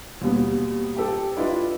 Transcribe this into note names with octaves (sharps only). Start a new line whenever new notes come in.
D#2 B2 G3 B3
G4 A4
D4 E4 F4 B4 D#5